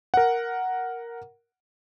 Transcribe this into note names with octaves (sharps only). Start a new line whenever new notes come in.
A#4 F#5